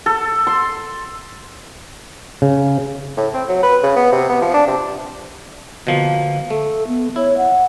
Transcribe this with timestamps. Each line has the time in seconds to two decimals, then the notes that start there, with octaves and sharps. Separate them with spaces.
0.06 A4
0.47 C6
2.42 C#3
3.17 A2
3.34 C4
3.48 F#3
3.63 B4
3.83 C#3
3.96 B3
4.12 C3
4.29 B3
4.41 F3
4.54 D4
4.67 C3
5.87 B2 D3 F3 A#3
6.50 A3 A4
6.87 B3
7.16 E4 C#5
7.37 F#5